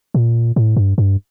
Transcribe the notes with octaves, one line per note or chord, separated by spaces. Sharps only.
A#2
A2
G2
G2